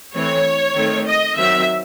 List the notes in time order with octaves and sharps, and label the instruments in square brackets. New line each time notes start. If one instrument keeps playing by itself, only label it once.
[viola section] E3 A3 C4 C#5
D#3 A3 C4
D#5
D#3 F#3 C4 E5